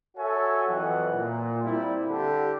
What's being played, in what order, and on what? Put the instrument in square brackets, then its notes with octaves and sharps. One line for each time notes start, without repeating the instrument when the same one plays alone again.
[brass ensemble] F#4 A4 C#5 E5 G#5
F2 E3 F#3 B4 F#5
A#2
G3 C4 E4
D3 G4 A4